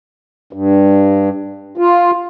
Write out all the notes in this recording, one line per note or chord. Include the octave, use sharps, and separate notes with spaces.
G2
F4